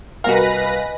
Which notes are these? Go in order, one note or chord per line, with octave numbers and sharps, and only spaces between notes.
C2 F#4 A#4 B4 D#5 F5 G#5 A#6